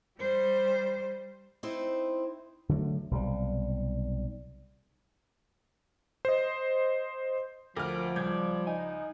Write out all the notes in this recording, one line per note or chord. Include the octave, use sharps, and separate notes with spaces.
G3 C5
C4 D#4 E4 C5
D3 F#3 G3 A3
B1 C3 G3
C5 D#5
D2 F3 A#4 D6 F6
C#2 G3 D5 G6 G#6
D#4 G#5